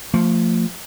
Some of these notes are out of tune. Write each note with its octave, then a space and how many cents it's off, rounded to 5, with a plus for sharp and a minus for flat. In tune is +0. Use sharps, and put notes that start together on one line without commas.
F3 +0 A3 +35